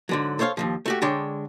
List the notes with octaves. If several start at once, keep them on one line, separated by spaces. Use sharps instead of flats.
G#2 D3 F#3
A4 C5 C#5 E5 F5
D#2 B2 F3
A3 F#4 G4
D3 G#3 D4 C#5 G5